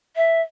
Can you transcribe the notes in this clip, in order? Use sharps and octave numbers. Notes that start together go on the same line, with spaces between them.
E5